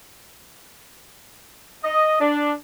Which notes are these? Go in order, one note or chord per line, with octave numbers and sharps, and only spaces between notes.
D#5
D4